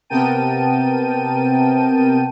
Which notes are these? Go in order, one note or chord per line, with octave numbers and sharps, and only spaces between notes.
C3 B3 A#4 G5 A5 D#7